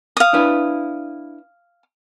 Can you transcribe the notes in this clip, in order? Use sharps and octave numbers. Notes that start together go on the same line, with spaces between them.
F5 D#6
D4 E4 B4